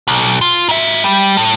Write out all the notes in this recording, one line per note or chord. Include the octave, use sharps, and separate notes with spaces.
B1
F4
G#2 E5
G3
A2